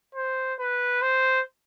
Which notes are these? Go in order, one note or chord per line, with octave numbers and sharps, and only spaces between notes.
C5
B4
C5